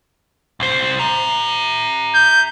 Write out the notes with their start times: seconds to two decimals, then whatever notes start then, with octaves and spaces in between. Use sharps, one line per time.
0.60 C2 C5
0.99 E5 A#5
2.15 G6